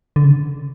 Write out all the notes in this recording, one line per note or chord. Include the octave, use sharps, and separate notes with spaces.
D3
C#3